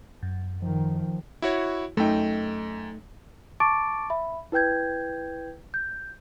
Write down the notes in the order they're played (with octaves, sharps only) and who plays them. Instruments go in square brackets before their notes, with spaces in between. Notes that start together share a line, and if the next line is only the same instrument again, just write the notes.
[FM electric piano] F#2
[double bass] D#3 [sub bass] F3
[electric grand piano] E4 F#4 C#5
[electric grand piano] F#2 G5 [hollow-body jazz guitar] A3 D#4
[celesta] A5 C#6 D6 A6 D7
E5 B5
E4 B4 G5 G6 G#6
G6